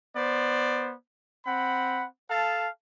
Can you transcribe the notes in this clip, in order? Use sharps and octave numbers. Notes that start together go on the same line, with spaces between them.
B3 C5 D5
C4 F#5 B5
A4 F5 A5